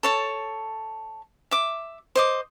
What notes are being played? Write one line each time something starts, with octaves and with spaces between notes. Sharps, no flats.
A4 C#5 A5
E5 D6
C5 D#5 D6